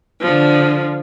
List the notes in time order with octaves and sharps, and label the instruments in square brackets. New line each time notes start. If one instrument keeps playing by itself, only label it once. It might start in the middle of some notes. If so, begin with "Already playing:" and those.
[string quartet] D3 F3